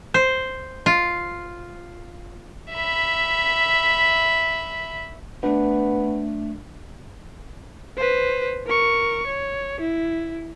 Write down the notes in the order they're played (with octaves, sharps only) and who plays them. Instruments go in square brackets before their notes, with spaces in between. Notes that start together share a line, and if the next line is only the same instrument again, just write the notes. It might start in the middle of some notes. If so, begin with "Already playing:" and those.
[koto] C5
F4
[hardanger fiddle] E5 B5
[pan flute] A3 [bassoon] B3 [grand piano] D4
[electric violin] B4 C5
A#4 C#6
C#5
E4